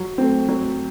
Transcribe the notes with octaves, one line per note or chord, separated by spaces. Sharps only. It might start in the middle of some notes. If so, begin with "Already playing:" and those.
Already playing: F#3
A3 C4
F#3